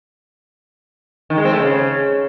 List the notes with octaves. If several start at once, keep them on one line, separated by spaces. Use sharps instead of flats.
D#3
G#3
C4
A3
C#3